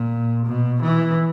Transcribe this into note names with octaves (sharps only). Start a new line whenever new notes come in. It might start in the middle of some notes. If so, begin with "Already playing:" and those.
Already playing: A#2
B2
E3